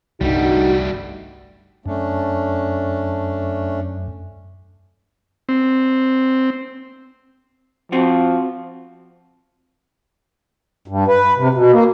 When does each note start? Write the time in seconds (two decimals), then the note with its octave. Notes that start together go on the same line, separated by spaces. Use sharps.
0.21 G1 C2 G2 G3 A3 D#4 F#4
1.86 F#2 A3 C#4 D4
5.49 C4
7.92 F3 C4 F4 F#4
10.88 G2
11.08 B4
11.37 C3
11.54 B2
11.72 A#3